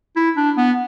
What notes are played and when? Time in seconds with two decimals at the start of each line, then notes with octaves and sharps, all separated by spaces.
0.16 E4
0.37 D4
0.57 B3